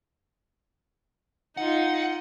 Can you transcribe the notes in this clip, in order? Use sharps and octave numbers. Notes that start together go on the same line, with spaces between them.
D#4 F4 F#5